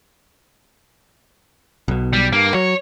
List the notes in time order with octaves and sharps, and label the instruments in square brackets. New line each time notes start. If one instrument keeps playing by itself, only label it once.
[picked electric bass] B1 B2
[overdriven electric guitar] G3
[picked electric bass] G2 [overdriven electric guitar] A#3
[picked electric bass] F#3 [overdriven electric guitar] C#5